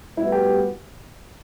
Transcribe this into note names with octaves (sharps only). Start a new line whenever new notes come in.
A2 G3 B3 E4 F#4 B4
G4